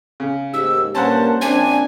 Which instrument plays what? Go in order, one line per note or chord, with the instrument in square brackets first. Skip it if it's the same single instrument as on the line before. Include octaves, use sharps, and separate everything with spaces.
[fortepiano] C#3
[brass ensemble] D#2 G#2 G4 [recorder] E6
[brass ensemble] G2 A#2 A#3 [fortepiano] C#4 C5 F#5 [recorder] A5
[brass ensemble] A#1 [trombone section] C4 D4 [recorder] G#5